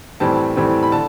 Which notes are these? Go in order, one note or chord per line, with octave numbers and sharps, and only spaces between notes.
A2 E3 G3 C4 A5
A2 E3 G3 C4
B5
D3 A5